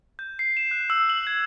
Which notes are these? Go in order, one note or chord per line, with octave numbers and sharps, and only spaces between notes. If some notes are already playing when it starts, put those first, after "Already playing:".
G6
C7
E7
F#6
E6
F#7
G#6